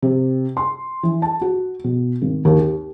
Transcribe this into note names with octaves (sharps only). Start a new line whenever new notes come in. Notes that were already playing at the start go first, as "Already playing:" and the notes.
C3
C6
E3
A5
F#4
B2
G#1
D#2
G4